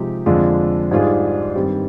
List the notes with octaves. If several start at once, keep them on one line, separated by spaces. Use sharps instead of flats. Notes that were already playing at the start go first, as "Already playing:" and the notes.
Already playing: C3 F3 G#3 D#4 G4
F2 D3 G#3 D4 F4
G#2 G3 D4 F4 G#4
G2 D#3 G3 C4 G4